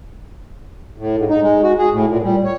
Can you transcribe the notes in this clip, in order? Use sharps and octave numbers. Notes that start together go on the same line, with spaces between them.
A2
G#2
D#4
G#3
F#4
G#4
A2
A#2
G3
C#5